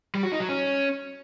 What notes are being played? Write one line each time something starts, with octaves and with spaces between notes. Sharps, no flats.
G3
F#4
D#4
F#3
C#4